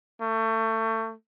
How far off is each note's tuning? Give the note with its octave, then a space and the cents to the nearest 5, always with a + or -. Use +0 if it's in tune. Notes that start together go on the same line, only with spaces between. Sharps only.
A3 +30